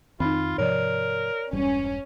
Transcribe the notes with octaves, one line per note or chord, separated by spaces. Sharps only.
F2 D#3 C4 D#4 F4 B5
G#2 C3 F3 A#4 C#5 D5
E1 G2 G3 C#4